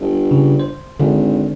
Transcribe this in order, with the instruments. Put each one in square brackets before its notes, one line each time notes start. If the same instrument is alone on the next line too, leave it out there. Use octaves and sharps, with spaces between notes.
[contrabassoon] G1
[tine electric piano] C#3
C5
[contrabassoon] G#1 [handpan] D3